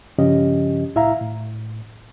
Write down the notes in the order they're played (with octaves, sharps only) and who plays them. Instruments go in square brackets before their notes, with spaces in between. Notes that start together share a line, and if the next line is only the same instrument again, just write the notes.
[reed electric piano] G2 C#3 F3 C#4 G4 D#5
C2 A2 E4 E5 F5 A#5
A2